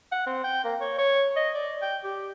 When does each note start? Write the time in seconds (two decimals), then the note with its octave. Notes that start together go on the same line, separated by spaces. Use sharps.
0.12 F#5
0.26 C4
0.44 G5
0.64 A#3
0.81 C#5
0.98 C#5
1.36 D#5
1.54 D5
1.82 G5
2.04 G4